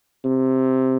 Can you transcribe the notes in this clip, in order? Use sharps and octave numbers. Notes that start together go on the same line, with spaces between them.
C3